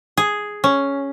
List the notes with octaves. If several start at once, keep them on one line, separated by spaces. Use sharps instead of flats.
G#4
C#4